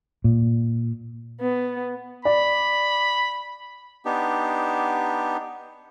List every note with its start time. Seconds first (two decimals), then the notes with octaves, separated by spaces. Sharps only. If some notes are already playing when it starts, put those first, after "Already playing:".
0.24 A#2
1.41 B3
2.25 D5 B5
4.05 B3 D4 D#4 G4